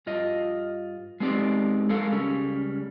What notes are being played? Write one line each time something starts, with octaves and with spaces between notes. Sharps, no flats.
G2 F4 D#5
G#3 B3 C4 D#4 G4 D5
G#3 A4 A#4 F5
C#2 G3 C#4